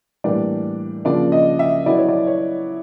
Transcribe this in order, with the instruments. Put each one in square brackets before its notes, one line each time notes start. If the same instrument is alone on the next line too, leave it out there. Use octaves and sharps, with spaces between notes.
[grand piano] A2 E3 G3 A#3 D4 D5
C#3 F3 A#3 D4 D5
D#5
E5
F#3 B3 E4 D5
C#5
D5
C#5